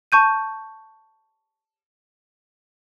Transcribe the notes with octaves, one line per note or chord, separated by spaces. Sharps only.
A5 C#6 G6 D#7